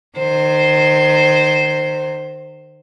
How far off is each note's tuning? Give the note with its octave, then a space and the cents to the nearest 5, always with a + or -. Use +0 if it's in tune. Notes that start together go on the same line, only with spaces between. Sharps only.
D#3 -30 C5 +5